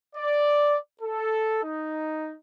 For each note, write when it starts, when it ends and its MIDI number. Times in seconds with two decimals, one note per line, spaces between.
0.15 0.76 74
1.02 1.60 69
1.64 2.34 63